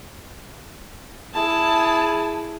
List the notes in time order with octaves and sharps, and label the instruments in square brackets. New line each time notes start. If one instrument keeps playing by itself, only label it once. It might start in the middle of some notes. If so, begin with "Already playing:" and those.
[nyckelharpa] E4 G#4 [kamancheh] A5